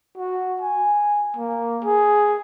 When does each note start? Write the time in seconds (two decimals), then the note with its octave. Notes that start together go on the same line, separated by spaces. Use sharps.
0.18 F#4
0.62 G#5
1.37 A#3
1.84 G#4